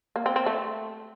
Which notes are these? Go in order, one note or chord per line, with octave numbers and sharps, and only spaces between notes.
A#3
C4
C4
A3